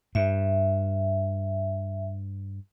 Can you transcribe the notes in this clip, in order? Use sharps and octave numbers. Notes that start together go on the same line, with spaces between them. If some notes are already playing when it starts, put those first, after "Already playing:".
G2 E5